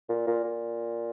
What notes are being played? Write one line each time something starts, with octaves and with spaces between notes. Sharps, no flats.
A#2
A#2
A#2